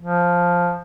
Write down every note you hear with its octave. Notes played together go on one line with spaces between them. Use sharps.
F3